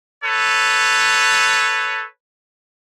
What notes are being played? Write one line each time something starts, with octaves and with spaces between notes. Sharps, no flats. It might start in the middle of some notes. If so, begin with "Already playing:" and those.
A4 B4 C#5